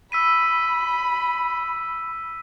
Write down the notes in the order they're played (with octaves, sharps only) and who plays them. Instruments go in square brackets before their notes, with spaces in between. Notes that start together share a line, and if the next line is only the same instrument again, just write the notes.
[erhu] B5 [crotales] E6 B6 D#7